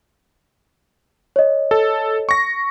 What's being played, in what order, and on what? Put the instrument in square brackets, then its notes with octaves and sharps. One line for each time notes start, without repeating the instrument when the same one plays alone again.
[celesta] C#5 D#5
[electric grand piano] A4
C#6 A#6